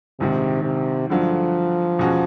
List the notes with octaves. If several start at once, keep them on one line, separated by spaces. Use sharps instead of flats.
A#1 G#2 C3 D#3
C3
G2 D3 F3 F#3 A3
E2 B2 G#3 C#4 F#4